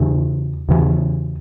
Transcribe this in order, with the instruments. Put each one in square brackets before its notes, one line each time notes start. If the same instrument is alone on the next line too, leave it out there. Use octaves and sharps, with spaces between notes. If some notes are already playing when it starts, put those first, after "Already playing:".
Already playing: [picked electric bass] E2 C#3 E3
E2 C#3 E3